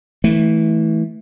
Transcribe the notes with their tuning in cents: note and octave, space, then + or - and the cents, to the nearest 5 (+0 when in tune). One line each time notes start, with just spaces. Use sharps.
E3 -20 A3 -10